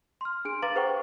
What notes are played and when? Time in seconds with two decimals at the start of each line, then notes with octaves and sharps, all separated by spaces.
0.21 C6 F6
0.45 D4 G#4 D7
0.62 B4 F5 A#5 D6 A6 F#7
0.75 G#4 B4 C5 F#5 G5 C#6